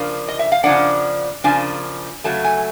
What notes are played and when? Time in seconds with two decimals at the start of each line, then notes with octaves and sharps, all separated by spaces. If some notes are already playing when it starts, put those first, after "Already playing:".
Already playing: C#3 F3 A#3 D4
0.28 D#5
0.39 E5
0.52 F5
0.64 C#3 F3 A#3 D4 F#5
1.44 C#3 F3 A#3 D4 G#5
2.24 C#3 F#3 A3 A5
2.44 G#5